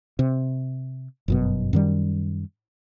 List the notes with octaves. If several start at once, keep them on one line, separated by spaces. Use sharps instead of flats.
C3
G1 F#2 B2
F#2 D#3 G3